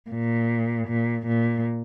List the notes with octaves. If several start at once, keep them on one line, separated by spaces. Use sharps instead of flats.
A#2
A#2
A#2